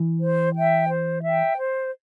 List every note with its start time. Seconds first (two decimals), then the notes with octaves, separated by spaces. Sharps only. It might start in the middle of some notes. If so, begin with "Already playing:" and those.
Already playing: E3
0.20 C5
0.55 E5 G5
0.89 C5
1.23 E5 G5
1.57 C5